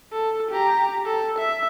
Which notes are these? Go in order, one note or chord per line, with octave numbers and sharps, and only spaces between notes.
A4
G4 A#5
A4
E5